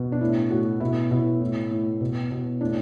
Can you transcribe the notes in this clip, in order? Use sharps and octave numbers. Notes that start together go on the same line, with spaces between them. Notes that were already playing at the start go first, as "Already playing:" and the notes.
Already playing: B2
D4
A2 E4
A2 F#4
B2 E4
B2 E4
A2
A2
B2
B2
A2 D4